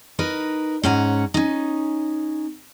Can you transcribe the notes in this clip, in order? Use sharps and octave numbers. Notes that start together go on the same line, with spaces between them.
D#4 A#4 B4
G#2 C#4 F#5 A#5
C#4 D#4